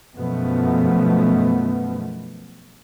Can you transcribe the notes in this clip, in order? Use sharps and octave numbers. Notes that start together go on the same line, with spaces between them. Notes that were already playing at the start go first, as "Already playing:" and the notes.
F#2 B2 F3 A3 B3